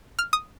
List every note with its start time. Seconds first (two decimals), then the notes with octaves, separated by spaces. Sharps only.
0.19 F6
0.33 D#6